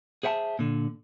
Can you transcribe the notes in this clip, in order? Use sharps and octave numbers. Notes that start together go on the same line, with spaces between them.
G#4 C5 E5 F#5 A5
A#2 D3